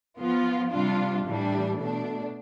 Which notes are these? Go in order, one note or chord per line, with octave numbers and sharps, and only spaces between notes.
F3 B3 F4
C3 G3 D4 F4
A2 E3 G3 D4
B2 A3 D4